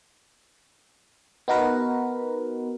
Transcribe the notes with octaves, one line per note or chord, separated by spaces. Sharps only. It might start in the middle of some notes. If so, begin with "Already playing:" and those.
B3 D#4 F#4 A#4 B4